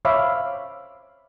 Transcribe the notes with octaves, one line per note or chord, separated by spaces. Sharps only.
C5 C#5 E5 F5 B5 D6